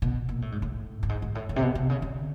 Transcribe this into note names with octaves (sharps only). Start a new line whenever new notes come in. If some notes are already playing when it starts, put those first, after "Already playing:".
B2
A#2
A2
G#2
A2
G2
G#2
G#2
A2
A2
C3
B2
C3
C#3
D3